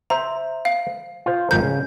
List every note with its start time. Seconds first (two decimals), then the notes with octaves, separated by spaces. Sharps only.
0.10 C5 E5 A#5
0.65 F5
1.26 F4 C5
1.51 G#1 F3 A#4 G6
1.63 C#3